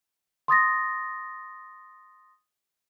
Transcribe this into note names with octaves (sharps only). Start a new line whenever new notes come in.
C6 D#6 A6 A#6